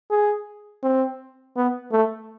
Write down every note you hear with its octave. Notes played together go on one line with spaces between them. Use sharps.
G#4
C4
B3
A3